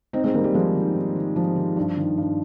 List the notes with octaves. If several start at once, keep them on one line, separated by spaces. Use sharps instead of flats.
G#2 C4 D#4
G#3 C4
D#3 G3 A#3
G3
G#2 F3 G#3
D#3
G#2
D#3
G#2 F3
D#3
G2
D#3
G2